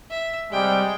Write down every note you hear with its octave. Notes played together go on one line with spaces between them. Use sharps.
E5
C3 G3 G#3 G5